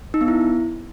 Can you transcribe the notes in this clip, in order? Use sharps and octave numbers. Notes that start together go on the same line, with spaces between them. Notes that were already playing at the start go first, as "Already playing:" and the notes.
D#4
B3
E4